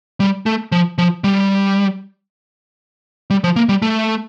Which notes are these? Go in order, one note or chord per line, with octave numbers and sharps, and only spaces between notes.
G3
A3
F3
F3
G3
G3
F3
A#3
G3
A3